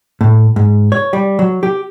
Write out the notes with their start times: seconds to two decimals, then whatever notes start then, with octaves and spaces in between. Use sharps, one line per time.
0.21 A2
0.56 G#2
0.92 C#5
1.13 G3
1.39 F#3
1.63 G4